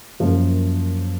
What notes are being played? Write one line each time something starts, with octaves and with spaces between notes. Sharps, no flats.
F#2 F3 A#3